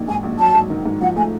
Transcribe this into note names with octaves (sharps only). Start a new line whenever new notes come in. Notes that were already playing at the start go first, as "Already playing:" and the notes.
Already playing: A#1 D#3
G#2 G#5
A#1
F#3 A5
G#2
D#3
G#2
F3 F#5
A3 G#5